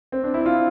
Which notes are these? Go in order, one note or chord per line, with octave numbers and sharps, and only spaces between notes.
C4
D4
E4
F4